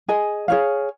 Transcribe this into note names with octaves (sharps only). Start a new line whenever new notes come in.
G#4 D#5 G#5
G#4 C#5 F5